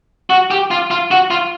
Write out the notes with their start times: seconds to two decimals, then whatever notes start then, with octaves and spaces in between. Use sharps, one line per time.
0.30 F#4
0.51 G4
0.71 F4
0.91 F4
1.11 F#4
1.31 F4